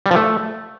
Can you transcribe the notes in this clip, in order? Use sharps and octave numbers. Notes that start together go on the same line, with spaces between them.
G3
F3
A3